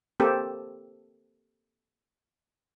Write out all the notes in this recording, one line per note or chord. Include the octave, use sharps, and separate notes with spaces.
A#3 C4 G4 A4